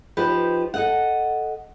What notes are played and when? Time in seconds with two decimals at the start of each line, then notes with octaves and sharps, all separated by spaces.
0.17 F3 D#4 G4 B4
0.74 A4 D#5 F#5